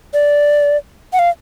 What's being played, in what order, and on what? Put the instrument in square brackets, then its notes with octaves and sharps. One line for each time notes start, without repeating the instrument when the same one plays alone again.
[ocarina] D5
F#5
F5